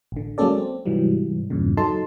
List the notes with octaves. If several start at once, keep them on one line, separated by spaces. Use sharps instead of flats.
A1 D3
F#3 G#3 A#3 C#4 A4 D5
C4
G#2 C3 E3 F#3 G3
E2 G2 A#2 C#3
F#3 D#4 A4 A5 C6